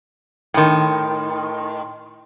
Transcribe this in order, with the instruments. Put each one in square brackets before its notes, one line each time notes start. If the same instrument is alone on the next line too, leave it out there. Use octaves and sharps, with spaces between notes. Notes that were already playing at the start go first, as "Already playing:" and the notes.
[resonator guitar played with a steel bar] A2 D#3 [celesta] G5 B5 C6